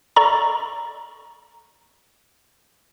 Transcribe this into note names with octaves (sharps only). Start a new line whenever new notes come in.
A4 D5 D#5 A#5 C#6